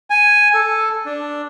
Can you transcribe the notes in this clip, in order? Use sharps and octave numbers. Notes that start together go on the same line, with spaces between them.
G#5
A4
D4